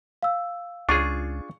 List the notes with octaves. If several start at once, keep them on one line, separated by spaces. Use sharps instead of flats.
F5 E6
C#2 D4 F4 G#4 C#6